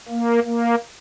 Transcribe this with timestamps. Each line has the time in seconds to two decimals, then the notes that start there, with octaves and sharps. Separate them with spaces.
0.08 A#3
0.43 A#3